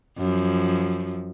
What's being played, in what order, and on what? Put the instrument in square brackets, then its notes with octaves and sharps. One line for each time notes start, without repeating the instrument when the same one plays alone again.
[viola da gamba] F#2 F3